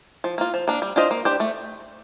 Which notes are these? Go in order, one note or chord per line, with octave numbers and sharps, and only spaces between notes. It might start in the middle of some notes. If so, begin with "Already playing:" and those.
F3
A#3 F4
F3
A#3 D4
G3
D4 F4 C5 D#5
A#3
D4 G4 C5
A3